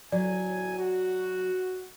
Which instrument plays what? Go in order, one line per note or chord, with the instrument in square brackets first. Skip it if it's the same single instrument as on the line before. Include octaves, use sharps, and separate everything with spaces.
[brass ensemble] G1 A2 G#5 [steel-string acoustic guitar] F#3 [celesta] D5
[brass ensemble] F#4